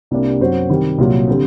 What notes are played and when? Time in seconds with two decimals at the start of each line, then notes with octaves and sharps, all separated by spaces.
0.11 C2 C3 G3 A#3 D4
0.40 F#2 F#3 C4 F#4 C5
0.69 C3 D#3 G3
0.98 C2 A#2 F#3
1.28 D3 G3 C4